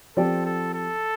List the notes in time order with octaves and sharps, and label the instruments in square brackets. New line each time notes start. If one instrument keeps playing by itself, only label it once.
[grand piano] F3 C4 G4 D5 [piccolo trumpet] A4
[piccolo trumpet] A4
A4